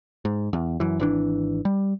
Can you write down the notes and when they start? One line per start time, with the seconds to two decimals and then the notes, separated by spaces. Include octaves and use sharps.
0.25 G#2
0.53 E2
0.80 F#2 E3
1.00 G#1 E3 D4
1.65 G3